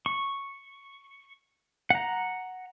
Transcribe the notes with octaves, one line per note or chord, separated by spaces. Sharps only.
C#6
F#5 A#5